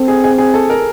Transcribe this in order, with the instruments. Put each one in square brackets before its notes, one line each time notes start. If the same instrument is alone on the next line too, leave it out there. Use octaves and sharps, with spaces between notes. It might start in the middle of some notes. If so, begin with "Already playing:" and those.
Already playing: [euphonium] C4 [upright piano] A4
[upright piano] G#4
G#4
G#4
A4
A#4